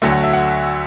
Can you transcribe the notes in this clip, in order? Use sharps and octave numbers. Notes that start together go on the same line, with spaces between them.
D2 D3 F#3 A3 E5
F#5
E5
F#5